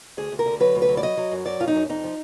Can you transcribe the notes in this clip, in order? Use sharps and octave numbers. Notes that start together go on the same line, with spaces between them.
D2 G#4
D2
A#4
D3
F#3 B4
D2
B4
F#3
D5
F#3 D#5
F#3
F#2
F#3 D5
F#2 F4
D#4
F#2
F2 D#4
F3